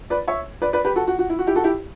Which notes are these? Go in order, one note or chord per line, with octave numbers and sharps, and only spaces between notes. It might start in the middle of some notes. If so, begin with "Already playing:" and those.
B4 D5
C#5 E5
B4 D5
B4 D5
G4 B4
F#4 A4
F#4
F#4
E4
F#4
E4 G4
F#4 A4
E4 G4